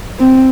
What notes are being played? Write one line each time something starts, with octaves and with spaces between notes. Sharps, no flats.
C4